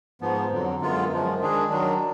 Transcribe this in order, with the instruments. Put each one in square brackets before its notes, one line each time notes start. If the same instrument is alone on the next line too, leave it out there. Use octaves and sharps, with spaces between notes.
[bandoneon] G#2 F3 B3
F2 D3 F#3
F#2 D3 G#3 B3 F4
F#2 F3 G#3
D#3 G#3 D4 G#4
D#3 F#3 D4